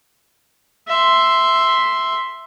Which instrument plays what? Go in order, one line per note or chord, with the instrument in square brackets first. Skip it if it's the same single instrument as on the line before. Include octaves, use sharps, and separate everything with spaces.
[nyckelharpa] E5 C6